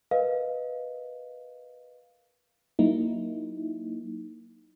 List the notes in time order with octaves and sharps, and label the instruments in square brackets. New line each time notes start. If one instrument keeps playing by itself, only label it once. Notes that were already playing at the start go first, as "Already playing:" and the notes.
[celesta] A#4 B4 D#5 F5
[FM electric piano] F#3 A#3 D#4 E4